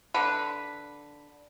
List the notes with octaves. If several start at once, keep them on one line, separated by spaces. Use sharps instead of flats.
D3 B4